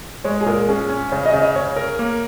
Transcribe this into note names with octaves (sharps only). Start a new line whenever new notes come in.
G#3 C#5
G#4
A#2 A#4
C#4 G#4
C#4
C#3 C#5
D#5
C#3
D#5
C#3 C#5
A#4 C#5
A#3